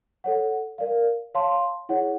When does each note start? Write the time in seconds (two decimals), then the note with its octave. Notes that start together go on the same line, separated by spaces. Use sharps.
0.24 A4 C#5 F#5
0.78 A#4 D5 F5
1.35 C#5 F5 A5 C6
1.89 E4 G#4 C#5 F#5